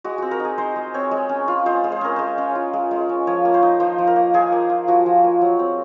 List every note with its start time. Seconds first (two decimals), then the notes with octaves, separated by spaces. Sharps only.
0.04 G#3 F#4
0.18 C4 F#4
0.31 A#4
0.40 D#4
0.45 G#4
0.58 G#3 C5
0.76 G#3
0.94 C4 C#5
1.11 G#3
1.29 C#4
1.48 F4
1.66 G#3 C5
1.84 G#3
1.92 C5
2.01 C#4 A#4
2.16 G#3 C5
2.38 C#4
2.55 F4
2.73 G#3
2.91 G#3
3.09 C#4
3.27 F3 C#5
3.45 A#3
3.54 C5
3.62 D#4
3.80 F3 C5
3.98 F3
4.07 A#4
4.16 A#3
4.34 F3 G#4
4.52 A#3
4.70 F4
4.88 F3 F#4
5.06 F3
5.24 A#3
5.42 F#3
5.59 C4